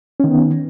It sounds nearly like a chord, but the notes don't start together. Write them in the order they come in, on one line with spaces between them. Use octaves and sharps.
C#4 D#3 B3